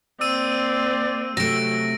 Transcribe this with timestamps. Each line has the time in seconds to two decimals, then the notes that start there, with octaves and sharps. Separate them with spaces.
0.21 A#3 C4 D5 E6 D#7
1.37 C3 F#3 A3 A#6 D7